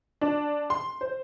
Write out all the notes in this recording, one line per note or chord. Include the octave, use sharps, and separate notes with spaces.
D4
C6
C5